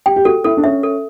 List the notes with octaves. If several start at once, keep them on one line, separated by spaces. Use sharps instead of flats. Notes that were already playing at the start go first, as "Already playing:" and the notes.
G4 G5
G4
F#4 A4
E4 A4
D4
C#4 E5
A4